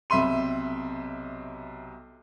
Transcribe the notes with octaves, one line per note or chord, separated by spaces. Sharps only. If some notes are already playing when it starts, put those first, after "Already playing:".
B1 C3 E5 B5 C6 D#7